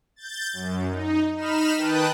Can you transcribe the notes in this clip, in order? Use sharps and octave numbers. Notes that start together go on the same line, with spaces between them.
G6 A6
F#2
D#4
D#4 B5 F6 E7
D#3 B4 G5 A5 D#6 F#6